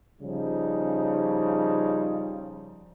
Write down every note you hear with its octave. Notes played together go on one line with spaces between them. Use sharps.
C#3 F3 G3 D#4